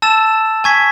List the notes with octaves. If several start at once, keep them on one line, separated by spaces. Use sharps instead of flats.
A5 E6 A6 E7
G#5 C#6 G#6 B6